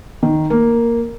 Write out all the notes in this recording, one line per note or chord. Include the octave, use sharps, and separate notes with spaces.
D#3
A#3